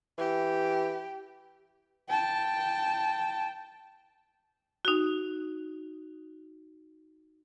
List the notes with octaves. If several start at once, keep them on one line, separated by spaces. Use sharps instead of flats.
E3 G4
G5 A5
D#4 F#4